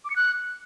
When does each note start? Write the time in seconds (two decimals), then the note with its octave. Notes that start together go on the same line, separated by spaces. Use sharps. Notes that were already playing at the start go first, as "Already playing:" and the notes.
0.05 D6
0.10 C#7
0.16 F#6